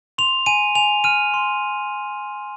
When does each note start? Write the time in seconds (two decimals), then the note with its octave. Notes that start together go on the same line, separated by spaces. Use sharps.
0.18 C6 F7
0.46 G#5 D#7
0.75 G#5 F7
1.04 F6 D#7
1.34 C6